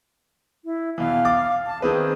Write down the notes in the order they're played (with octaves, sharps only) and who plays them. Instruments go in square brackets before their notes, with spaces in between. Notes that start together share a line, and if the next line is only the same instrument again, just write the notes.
[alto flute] E4
[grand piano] E2 B2 E3 [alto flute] F5
[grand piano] D6 A6
[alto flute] A5
[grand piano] D#3 C4 B4 [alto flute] G#4